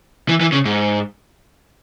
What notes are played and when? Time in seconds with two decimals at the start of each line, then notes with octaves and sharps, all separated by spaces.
0.29 E3
0.41 E3
0.52 C#3
0.65 G#2